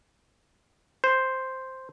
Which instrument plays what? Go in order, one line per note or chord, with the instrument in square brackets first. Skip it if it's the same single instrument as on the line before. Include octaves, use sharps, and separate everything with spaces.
[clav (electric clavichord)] C5